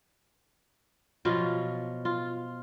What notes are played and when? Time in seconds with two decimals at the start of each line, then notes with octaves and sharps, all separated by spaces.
1.25 B2 F3 F#3 F4
2.05 F4